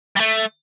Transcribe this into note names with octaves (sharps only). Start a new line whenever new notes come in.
G3
A3